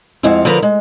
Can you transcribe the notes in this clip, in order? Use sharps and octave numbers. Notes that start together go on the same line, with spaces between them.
F2 G#3 C4 E4 F5 F#5
D3 F3 A#4 B4 A#5
G#3